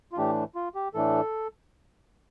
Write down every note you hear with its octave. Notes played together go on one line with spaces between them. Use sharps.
F4
A2 E3 A3 D4 G4
F4
G4
A2 E3 A3 D4 A4